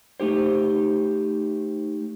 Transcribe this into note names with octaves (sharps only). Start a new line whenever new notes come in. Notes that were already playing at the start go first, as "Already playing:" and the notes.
A3 D#4 G4 C5